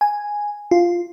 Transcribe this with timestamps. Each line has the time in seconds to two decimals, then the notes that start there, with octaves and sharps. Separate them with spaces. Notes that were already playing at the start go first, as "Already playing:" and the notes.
0.01 G#5
0.71 F4